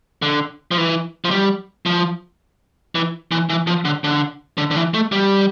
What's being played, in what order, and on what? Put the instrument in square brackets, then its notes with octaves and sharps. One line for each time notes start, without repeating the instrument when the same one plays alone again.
[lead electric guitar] D3
F3
E3
F3
G3
F3
E3
E3
E3
F3
D3
D3
D3
D3
E3
A3
G3